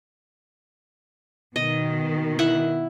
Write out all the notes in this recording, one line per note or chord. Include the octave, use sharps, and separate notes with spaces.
B2 D#3 D#5
E4 F#5